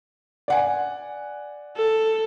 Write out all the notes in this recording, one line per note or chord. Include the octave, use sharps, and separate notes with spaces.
D5 F#5 G#5
A4